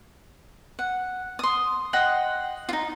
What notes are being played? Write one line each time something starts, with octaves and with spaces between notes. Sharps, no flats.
F#5
C6 D#6
D#5 F#5 G5 C6
D#4 F4